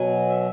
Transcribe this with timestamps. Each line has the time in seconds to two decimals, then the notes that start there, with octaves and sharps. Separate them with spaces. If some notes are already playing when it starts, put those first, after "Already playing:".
Already playing: B2 F#3 G#5
0.29 E5